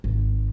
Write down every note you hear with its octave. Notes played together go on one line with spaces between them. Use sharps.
G#1